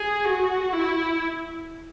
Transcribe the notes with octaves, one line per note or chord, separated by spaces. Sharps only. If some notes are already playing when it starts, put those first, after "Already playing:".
Already playing: G#4
F#4
E4